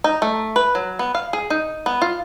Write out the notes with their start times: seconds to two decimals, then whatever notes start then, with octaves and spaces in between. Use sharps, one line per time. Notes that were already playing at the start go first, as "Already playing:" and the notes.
0.04 D#4
0.22 A3
0.56 B4
0.75 F#3
0.99 B3
1.15 F5
1.33 G#4
1.50 D#4
1.86 B3
2.02 F4